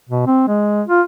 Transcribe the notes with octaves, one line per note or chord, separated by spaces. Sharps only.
B2
C4
G#3
F4